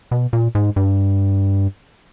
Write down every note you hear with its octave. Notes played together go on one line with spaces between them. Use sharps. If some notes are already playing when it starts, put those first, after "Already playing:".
B2
A#2
G#2
G2